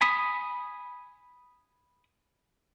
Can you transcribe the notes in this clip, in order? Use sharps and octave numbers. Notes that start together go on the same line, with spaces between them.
G#5 B5 D#6